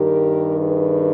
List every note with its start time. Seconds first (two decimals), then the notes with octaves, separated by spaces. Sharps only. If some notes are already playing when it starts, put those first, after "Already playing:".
Already playing: G2 D#3 G4 A#4
0.59 G#4 B4